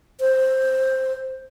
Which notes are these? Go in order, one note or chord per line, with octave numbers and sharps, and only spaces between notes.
C5